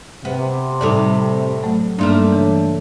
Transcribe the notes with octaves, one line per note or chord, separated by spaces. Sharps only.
C3 B3
A2 G3 D#4 A4 D5 A5
F#3 A3
G2 A3 A#3 D4 D#4 A#4 C6
C#3 E3